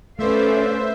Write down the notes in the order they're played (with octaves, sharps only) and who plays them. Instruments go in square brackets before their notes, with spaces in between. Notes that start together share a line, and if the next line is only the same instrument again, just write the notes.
[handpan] A3 B4 [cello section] C#4 D5 F5 [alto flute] A4 [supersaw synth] C5 E5